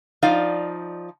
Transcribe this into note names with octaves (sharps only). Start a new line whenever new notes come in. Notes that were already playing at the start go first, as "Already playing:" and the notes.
F3 D#4 D5 F5